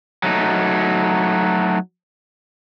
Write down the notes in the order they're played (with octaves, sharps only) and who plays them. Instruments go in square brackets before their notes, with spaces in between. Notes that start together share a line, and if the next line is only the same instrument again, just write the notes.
[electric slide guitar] F#3 A3 D#4